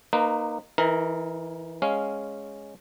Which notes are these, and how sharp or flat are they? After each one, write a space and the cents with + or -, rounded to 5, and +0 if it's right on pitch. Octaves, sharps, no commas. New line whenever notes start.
A#3 +0 D#4 -20 B4 +20
E3 +0 D#4 +35 A#4 +0
G#3 +0 C#4 +0 F5 +0